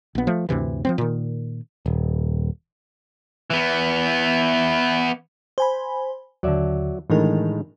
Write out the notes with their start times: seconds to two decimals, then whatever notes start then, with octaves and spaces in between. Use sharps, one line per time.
0.15 A#1 B3
0.27 F3 A3
0.49 D2 G2 C3 E3
0.85 F3 F#3 C4
0.98 A#2 D#3
1.86 D#1
3.50 E3 B3
5.58 C5 G#5 B5
6.43 D#2 D3 F#3 D5 E5
7.10 A2 D#3 E3 G#3 D4 A#4